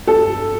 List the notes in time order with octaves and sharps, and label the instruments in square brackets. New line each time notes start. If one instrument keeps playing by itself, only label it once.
[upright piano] A4